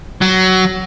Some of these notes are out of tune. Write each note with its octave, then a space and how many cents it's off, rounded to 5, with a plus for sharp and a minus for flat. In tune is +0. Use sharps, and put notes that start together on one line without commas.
F#3 +15